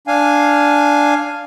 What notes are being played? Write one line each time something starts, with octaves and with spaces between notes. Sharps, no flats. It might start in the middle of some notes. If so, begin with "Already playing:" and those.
D4 F5 G#5